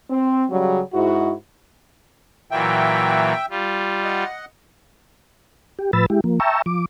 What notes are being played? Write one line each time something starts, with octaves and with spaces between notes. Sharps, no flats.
C4
C#3 F#3 G3
G#2 E4 F#4
A#2 E3 F#3 E5 G5
G3 F4
D#5 F#5
G4
A2 F3 B4 B5 E6 A6
G#3 E4 G4
F3 A#3
E5 G5 A5 A#5 C#6 E6
F3 D6